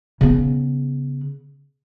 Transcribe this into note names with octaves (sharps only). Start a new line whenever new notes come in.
C#3 B3